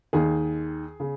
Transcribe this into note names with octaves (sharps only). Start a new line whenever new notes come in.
D#2 D#3 G#4
C#3